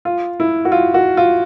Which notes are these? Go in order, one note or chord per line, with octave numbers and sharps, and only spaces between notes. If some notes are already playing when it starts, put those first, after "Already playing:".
F4
E4
F#4
F4
F#4
F4